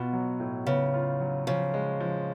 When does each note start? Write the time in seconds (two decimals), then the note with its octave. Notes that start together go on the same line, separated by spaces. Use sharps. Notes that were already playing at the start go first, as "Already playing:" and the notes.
Already playing: B2 F4
0.13 F#3
0.40 A2
0.66 C#3 B3
0.94 F4
1.20 F#3
1.47 C#3 F3
1.74 G#3
2.00 F3